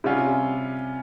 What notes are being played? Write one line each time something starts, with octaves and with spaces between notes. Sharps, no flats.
C3 G3 C#4 F4